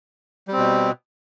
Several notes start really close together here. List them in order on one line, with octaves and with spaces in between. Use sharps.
G3 C4 B2